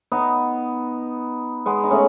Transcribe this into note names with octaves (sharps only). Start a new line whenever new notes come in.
B3 D#4
G#3 B3
D#4
A3 C#4